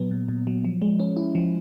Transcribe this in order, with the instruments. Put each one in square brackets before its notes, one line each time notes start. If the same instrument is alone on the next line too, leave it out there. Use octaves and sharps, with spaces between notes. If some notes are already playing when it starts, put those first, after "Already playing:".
Already playing: [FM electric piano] A#2 F#3 B3
A#2
A#2
F#3
F3
G#3
C#4
E4
F3